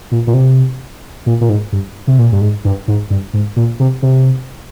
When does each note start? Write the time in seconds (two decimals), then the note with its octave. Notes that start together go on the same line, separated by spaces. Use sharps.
0.11 A#2
0.27 A#2
0.34 C3
1.26 A#2
1.41 A#2
1.49 G#2
1.72 G2
2.07 C3
2.19 A#2
2.32 G2
2.41 G#2
2.65 G2
2.88 G#2
3.10 G2
3.34 G#2
3.56 A#2
3.80 C3
4.03 C3